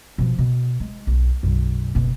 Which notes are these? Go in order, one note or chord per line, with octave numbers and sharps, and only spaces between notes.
B2 F3
B2
G#3
B1
B1 F#2
F#1 B2